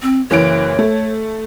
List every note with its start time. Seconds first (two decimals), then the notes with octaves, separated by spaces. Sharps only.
0.02 C4
0.31 F#1 E3 C#5 D7
0.79 A3